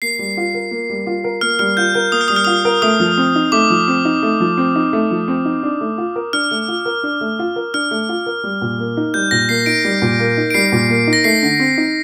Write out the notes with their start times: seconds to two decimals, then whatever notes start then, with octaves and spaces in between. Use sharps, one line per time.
0.02 A#3 C7
0.19 G3
0.37 F4
0.54 A#4
0.71 A#3
0.90 G3
1.07 F4
1.24 A#4
1.41 A#3 F6
1.59 G3 F6
1.77 F4 G6
1.94 A#4 G6
2.12 A#3 D#6
2.21 F6
2.28 G3 D#6
2.36 F6
2.45 F4 D#6
2.65 A#4
2.82 A3 D#6
3.00 F3
3.18 C4
3.35 D#4
3.52 A3 D6
3.70 F3
3.88 C4
4.05 D#4
4.23 A3
4.40 F3
4.58 C4
4.75 D#4
4.93 A3
5.11 F3
5.28 C4
5.45 D#4
5.63 D4
5.81 A3
5.98 F4
6.16 A#4
6.33 D4 F6
6.51 A3
6.68 F4
6.85 A#4
7.03 D4
7.21 A3
7.39 F4
7.56 A#4
7.74 D4 F6
7.91 A3
8.09 F4
8.26 A#4
8.44 G3
8.61 A#2
8.79 A#3
8.97 D#4
9.14 G3 G6
9.31 A#2 A#6
9.49 A#3 C7
9.66 D#4 D7
9.85 G3
10.02 A#2
10.19 A#3
10.37 D#4
10.50 D7
10.54 G3 C7
10.72 A#2
10.90 A#3
11.07 D#4
11.13 A#6
11.24 A3 C7
11.43 D3
11.60 C4
11.77 D#4